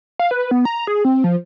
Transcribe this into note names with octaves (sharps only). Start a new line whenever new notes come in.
F5
B4
B3
A#5
G#4
C4
F3